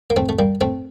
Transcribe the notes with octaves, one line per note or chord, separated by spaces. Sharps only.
A#3
A3 C4
A3
G3 A#3
A3 C4